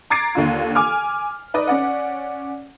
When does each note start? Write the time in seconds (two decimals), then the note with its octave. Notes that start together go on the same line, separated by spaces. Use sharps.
0.10 A#5 D6 G#6 A6 C7 D7
0.35 D#2 D3 F4
0.75 G#5 D6 F6
1.54 D#4 B4 D5 D#5
1.67 C#4 D5 F#5